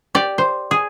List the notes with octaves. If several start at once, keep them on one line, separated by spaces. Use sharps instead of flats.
G4 D5
C5
G#4